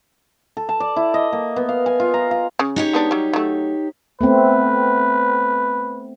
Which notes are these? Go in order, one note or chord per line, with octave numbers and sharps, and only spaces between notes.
A4
A5
D5
E4
D#5
A#3
B3
F5
G#5
F4
A#5
F5
C#3
D#4 G4 C#5
G#3 B3 D4
F#3 G3
F#3 A3
A3 B3 C4 B4